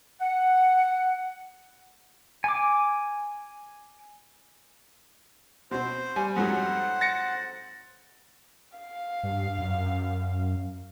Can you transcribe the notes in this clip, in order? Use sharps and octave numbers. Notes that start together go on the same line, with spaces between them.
F#5
G#5 D6
B2 C4 C5
G3 G#5
F2 G#2 F#3 C5 F#5
A6 A#6 C#7
F5
G2
F#2